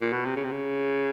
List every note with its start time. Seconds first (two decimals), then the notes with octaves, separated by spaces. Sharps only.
0.02 A#2
0.13 B2
0.26 C3
0.36 C#3
0.44 C3
0.52 C#3